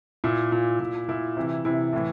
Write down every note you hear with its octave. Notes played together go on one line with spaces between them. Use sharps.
A#2 E4
A#2
A#2
A#2 E4
C3 E3
C3 E3 E4
A2 E3